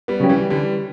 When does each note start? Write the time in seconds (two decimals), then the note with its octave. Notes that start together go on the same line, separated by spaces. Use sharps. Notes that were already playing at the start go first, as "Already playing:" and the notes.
0.08 G3 B3
0.20 C#3 F#3 C#4 G4
0.29 E3 G3
0.50 D3 E3 G3